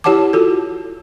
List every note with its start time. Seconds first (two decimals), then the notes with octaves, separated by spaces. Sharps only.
0.04 E4 G4 C#5 F#5 A5 D6
0.33 F4 F#4 A4